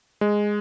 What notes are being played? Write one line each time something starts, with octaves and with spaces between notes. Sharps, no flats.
G#3